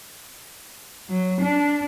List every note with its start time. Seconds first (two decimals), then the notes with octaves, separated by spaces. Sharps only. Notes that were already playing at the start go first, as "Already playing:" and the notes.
1.08 F#3
1.42 D4